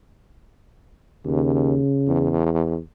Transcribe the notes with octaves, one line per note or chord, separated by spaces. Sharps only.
D#2 C#3
E2